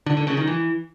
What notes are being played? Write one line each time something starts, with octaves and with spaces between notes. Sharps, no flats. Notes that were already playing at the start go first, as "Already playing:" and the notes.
D3
D3
C#3
D#3
E3